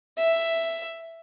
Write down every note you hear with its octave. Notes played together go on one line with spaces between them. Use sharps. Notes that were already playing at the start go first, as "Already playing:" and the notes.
E5